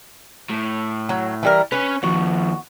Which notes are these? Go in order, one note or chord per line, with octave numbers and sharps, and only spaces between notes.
A2
F#3
E3 G3 A#4
C#4 B4 C#5
D#2 F3 F#4